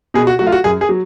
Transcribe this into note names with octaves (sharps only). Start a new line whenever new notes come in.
B2 G#4
F#4
F#3 A3 F#4
F4
F#4
F#2 G#4
G#4
F#3